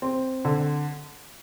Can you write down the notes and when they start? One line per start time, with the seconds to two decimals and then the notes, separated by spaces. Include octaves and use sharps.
0.02 C4
0.45 D3